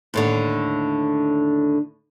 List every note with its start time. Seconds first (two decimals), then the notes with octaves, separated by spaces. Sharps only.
0.14 D#2 A2 D3